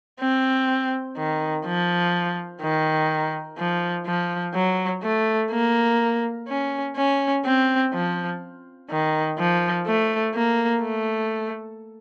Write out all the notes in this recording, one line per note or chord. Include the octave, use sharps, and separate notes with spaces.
C4
D#3
F3
D#3
F3
F3
F#3
A3
A#3
C#4
C#4
C4
F3
D#3
F3
A3
A#3
A3